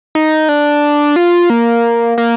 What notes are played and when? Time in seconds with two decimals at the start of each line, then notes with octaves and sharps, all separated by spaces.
0.15 D#4
0.49 D4
1.16 F4
1.50 A#3
2.18 A#3